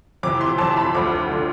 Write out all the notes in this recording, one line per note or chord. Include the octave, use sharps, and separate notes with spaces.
F2 C3 E3 D6
C6
F2 C3 E3 A5
B5
D2 D3 F3 D6
D3 F3